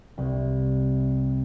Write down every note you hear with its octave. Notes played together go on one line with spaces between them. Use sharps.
C2